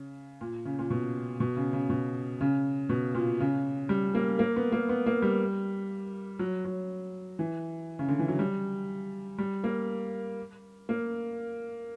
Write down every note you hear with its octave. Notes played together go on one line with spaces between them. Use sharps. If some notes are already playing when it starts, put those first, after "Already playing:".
Already playing: C#3
A#2
C#3
A#2
B2
B2
C#3
C#3
B2
C#3
B2
A#2
C#3
G3
A#3
A#3
B3
A#3
B3
A#3
G3
F#3
F#3
E3
C#3
D3
E3
F#3
G3
G3
A#3
A#3